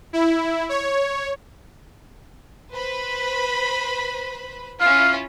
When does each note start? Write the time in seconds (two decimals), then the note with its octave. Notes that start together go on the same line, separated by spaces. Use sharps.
0.13 E4
0.69 C#5
2.72 B4 C5 B5
4.81 C#4 E4 F4 F5